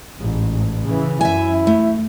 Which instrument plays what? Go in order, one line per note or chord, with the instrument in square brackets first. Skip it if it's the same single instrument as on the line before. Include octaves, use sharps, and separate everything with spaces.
[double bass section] A1 G#2
C#3 E3
[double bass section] F#2 [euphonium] E4 [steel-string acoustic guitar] E5 G#5
[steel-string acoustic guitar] A3